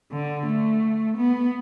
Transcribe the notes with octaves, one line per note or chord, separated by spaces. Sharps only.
D3
A3
B3